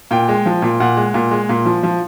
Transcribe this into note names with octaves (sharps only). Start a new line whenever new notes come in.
A#2 G5
G#3
F3
A#2
A#2 F#5
G#3
A#2
G#3
A#2
F3
F3